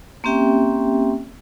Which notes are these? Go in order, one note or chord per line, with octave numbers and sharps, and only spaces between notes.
A#3 C4 C#4 G4 E5 G5